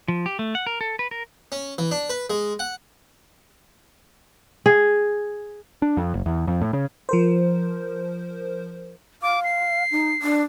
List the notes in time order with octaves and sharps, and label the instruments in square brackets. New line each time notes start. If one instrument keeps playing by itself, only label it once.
[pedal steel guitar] F3
G4
A3
F#5
A#4
A4
B4
A#4
[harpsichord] C#4
E3
D4
B4
G#3
F#5
[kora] G#4
[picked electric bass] D4
F2
F#1
E2
F2
A2
C#3
[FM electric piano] F3 A#4 C5
[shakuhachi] F5 [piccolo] D6
[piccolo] C7
[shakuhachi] D#4
D4